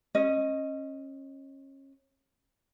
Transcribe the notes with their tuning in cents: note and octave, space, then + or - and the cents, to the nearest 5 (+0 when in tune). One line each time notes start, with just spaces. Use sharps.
C#4 -30 D#5 +0